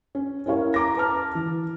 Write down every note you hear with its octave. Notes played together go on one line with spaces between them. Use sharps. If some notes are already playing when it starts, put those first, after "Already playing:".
C#4
C#4 E4 A#4 C#5 F5
A#5 D6 A#6
B4 A5 F6
E3